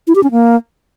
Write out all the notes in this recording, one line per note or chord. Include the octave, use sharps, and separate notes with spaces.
E4
G4
C#4
A#3